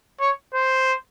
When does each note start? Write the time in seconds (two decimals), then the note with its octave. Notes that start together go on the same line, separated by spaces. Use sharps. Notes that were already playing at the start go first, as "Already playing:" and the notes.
0.20 C#5
0.54 C5